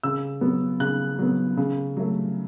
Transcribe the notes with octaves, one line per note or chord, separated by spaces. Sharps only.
C#3 E6
F#3 B3
C#3 F#6
F#3 B3
C#3
F#3 A3